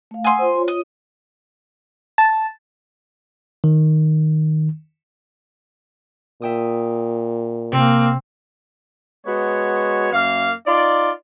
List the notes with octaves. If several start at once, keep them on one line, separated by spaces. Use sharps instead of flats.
A3 F5
F#5 G#5 C6 D#6 E6
F4 C5
F4 C#5
D#5
A5
D#3
A#2 E5 G5 D#6
C3 A#3 C4
G#3 B3 F#4 C#5
F#2 A#3 F5
D#4 F4 D5